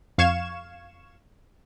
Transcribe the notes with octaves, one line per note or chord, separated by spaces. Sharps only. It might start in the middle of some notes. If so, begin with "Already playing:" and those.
F2 F5 C#6 G#6 E7